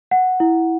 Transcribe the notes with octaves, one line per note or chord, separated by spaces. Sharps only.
F#5
E4